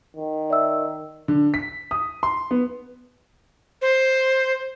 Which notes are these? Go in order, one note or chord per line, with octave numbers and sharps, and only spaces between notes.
D#3
D5 E5 E6
D3
B6
D#6
C6
B3
C5